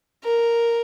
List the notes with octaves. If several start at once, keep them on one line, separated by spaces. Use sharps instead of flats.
A#4